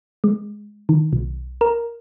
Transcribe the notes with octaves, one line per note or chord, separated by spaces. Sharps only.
G#3
D#3
B1
A#4